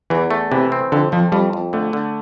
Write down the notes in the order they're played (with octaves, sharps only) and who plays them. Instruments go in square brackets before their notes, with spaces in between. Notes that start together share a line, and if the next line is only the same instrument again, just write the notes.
[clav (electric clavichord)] E2 [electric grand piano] E3
[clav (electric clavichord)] A3
[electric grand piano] C3 [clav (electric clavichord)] E3
[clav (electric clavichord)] C4
[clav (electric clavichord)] F2 [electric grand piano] D3
[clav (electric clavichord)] F2 [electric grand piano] F3
[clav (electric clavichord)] F2 [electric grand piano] G3
[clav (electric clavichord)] F2
[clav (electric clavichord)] D3 [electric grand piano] A3
[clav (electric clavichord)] D3